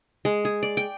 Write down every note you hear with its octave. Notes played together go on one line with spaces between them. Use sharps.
G#3
G#4
D5
G5